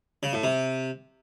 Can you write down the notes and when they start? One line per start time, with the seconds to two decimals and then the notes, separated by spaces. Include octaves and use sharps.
0.23 C#3
0.33 A2
0.44 C3